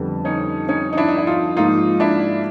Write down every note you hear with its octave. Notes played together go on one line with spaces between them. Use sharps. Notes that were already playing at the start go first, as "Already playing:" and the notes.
Already playing: F2 D3 G3 B3
C#4 D#4
C#4 D#4
D#4
D4 E4
D#4
E4
D#4 F4
G#2 F3 A#3 D#4 F4
D4 E4